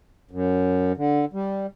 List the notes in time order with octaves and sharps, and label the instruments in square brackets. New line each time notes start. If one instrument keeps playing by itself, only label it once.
[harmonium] F#2
D3
G3